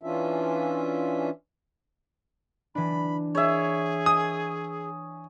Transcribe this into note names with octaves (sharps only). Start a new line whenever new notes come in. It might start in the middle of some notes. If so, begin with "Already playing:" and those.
E3 C#4 D4 F4 E5
E3 D4 B5
G#4 C#5 E5
G#5 D#6